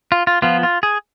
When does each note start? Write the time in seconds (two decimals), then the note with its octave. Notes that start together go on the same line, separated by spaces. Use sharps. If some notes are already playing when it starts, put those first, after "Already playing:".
0.12 F4
0.27 F4
0.42 F3 B3 F4
0.63 F4
0.83 G#4